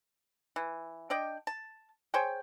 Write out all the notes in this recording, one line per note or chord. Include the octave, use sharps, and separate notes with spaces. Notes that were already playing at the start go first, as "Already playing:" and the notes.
E3
D4 D5 D#5 G5
A5
G#4 C5 C#5 G5